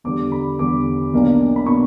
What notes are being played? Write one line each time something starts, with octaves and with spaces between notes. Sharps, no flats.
E2 D3 G3 D6
B5
E2 D3 G3 D6
B1 B2 A#3 D4
B5
B2 A#3 D4 C#6